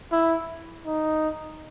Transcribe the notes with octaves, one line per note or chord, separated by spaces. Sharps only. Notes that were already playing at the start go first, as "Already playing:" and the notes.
E4
D#4